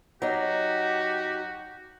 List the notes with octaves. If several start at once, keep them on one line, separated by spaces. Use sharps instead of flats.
F#3 D#4 F#4 G4